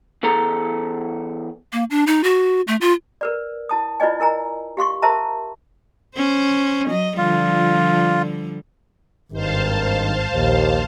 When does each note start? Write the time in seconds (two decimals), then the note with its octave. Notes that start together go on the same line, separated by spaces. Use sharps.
0.23 E2 G#4 A4 A#5
1.73 A#3
1.90 D4
2.07 D#4
2.23 F#4
2.67 A3
2.81 F4
3.21 A#4 B4 D5
3.69 E4 A5 D#6
4.00 E4 F4 B4 D5 D#5 G#5
4.20 E4 A#4 G#5 A#5
4.77 G4 F5 C6 C#6
5.02 A#4 C5 E5 A5 A#5
6.16 C#4 C5
6.88 F#3 D#5
7.18 D3 F3 G3 F4
9.33 G#1 G2 D#3 C5 F5 A5
10.33 A#1 D#2